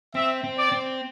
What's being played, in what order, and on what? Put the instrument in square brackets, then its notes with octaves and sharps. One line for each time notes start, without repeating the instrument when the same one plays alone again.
[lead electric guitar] C4 [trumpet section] E5
[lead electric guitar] C4
[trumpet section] D5
[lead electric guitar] C4